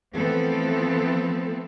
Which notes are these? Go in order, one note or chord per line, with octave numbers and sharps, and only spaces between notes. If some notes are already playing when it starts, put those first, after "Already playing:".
E3 F3 A3 B3 C4 A4